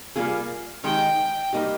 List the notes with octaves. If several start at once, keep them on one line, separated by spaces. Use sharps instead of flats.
G3 A#3 F4 G#4
D#3 G#3 D#4 G4 G5
G3 A#3 D#4 G4